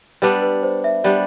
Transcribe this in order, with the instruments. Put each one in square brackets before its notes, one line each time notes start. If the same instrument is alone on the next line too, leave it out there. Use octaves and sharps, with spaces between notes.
[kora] G3 B3 D4 [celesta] B4
[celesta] B4
C5
E5
[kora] G3 B3 D4 [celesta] D5